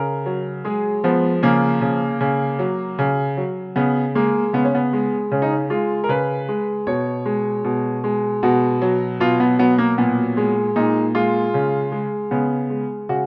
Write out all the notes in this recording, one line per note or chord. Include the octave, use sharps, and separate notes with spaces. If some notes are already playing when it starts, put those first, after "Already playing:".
Already playing: C#3 A#4
F#3
G#3 G#4
F3 B3
C#3 A#3
C#3
C#3
F#3
C#3
F#3
C#3 B3
G#3 A#3
C#3 B3
C#4
B3
G#3
C#3 C#4
D#4
C#4
G#3 F4
A#4
C#3 B4
G#3
B2 C#5
G#3
B2
G#3
B2 F#4
F#3
B2 F4
B3
F#3 B3
A#3
A#2 B3
G#3
A#2 D#4
G#3 F4
C#3
G#3
C#3 B3
G#3
C#3 F#4